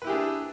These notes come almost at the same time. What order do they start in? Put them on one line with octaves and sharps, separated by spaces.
B4 E4 G4 G#4 D4